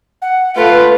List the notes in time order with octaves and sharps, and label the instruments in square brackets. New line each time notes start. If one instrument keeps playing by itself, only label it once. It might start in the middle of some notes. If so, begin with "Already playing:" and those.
[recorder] F#5
[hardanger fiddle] A3 F4 [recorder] B4